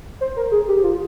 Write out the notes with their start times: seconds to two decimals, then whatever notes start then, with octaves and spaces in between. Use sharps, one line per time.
0.21 C5
0.36 A#4
0.52 G#4
0.68 G4
0.83 F4